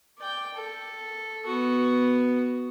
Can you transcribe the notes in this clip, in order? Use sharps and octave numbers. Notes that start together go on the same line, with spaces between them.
D5 G5
A4
B3 F#4